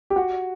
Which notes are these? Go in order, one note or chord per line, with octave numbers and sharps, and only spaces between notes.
G4
F#4